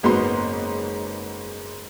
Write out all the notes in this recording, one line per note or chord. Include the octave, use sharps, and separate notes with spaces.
F#1 G#2 F#3 B3 C6